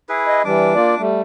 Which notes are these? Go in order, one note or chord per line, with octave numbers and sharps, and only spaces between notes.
E4 G#4 B4
D#5
E3 G3 D4 D6
A#3 F4 D5
G3 A3